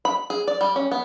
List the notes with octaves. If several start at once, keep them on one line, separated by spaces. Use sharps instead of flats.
B5
G#4
D5
G3
C#4
B3